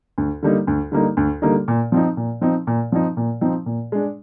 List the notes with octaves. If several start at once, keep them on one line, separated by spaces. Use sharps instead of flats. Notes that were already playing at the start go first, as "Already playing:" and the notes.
D2
D3 G3 A#3 D#4
D2
D3 G3 A#3 D#4
D2
D3 G3 A#3 D#4
A#2
F3 C4 D#4
A#2
F3 C4 D#4
A#2
F3 C4 D#4
A#2
F3 C4 D#4
A#2
G#3 D4